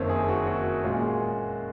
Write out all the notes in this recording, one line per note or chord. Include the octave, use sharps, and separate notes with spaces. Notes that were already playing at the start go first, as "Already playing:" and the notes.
Already playing: F#1 F2 D#3 A#3 C5 C#5
G#4
F#4
F#4
A#2 G#3 C#4 F4